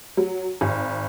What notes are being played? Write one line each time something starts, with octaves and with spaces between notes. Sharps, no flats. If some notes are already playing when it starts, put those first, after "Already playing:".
F#3
G#1